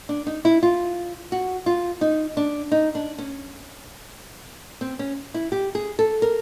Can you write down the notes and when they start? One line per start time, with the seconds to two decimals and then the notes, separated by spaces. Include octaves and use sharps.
0.09 D4
0.27 D#4
0.45 E4
0.63 F4
1.32 F#4
1.66 F4
2.01 D#4
2.37 D4
2.72 D#4
2.95 D4
3.18 C#4
4.81 C4
4.99 C#4
5.34 E4
5.52 G4
5.75 G#4
5.99 A4
6.22 A#4